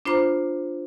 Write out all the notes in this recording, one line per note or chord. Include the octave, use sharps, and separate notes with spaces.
D4 F4 C5 A#5 B5 D6